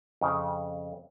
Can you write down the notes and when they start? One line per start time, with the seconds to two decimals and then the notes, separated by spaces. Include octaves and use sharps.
0.21 F2 C#3